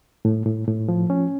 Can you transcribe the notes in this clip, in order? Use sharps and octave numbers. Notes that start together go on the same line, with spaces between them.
A2
A2
A2
F3
C#4